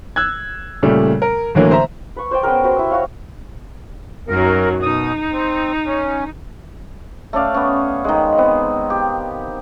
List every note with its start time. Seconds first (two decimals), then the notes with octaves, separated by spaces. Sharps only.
0.16 E6 F#6 G#6
0.83 A#2 C#3 G3 A3
1.22 A#4
1.55 A2 D3 E3 F#3 A#3
1.71 C5 E5 A#5
2.16 B4 C#6
2.31 C5 D5 G5
2.43 B3 C#4 G#4 A#4
2.64 F#4 G4 B4 C5
2.76 E4 E6
2.90 F#4 C#5 F5
4.28 F#2 D#3 F#3 A#4
4.82 B2 D#4 D#6
5.32 C4
5.86 C#4
7.33 A3 C#4 D5 F5
7.54 B3 C#4
8.04 D#3 G#3
8.38 B3 C4
8.90 G4